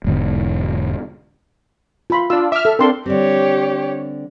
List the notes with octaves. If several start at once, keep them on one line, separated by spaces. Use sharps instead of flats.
E1 G#2 D3
F4 B5 C6
D4 F4 E6
E5 D6 F6
A4
C4 D4 A4 A#4 C6
D3 G3 C4 G4 C#5